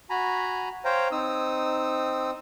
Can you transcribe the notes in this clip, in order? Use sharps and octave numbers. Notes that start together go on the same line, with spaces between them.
F#4 G#5 A#5 B5
C5 C#5 F5 G5 A#5
C4 D#4 D#6 E6